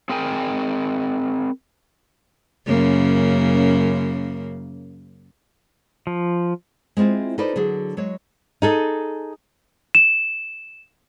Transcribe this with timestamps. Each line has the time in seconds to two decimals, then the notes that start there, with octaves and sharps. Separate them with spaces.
0.09 C4 G#4 A#4 G5 G#5
2.66 F#2 C#3 A#3
6.07 F3
6.97 G#3 C4 E4 F4 C5
7.38 D#4 F4 A4 B4 C5 D5
7.56 D3 F#3 G#4
7.97 F#3 G#3 C#5
8.62 D#4 G#4 A4
9.95 E7